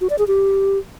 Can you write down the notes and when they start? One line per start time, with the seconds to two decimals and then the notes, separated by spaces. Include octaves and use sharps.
0.01 F#4
0.10 D5
0.19 G#4
0.27 G4